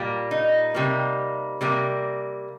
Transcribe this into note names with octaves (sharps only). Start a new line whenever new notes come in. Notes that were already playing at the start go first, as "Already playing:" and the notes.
Already playing: A#2 G3 A#3
D#4
C3 G3 A#3
C3 G3 A#3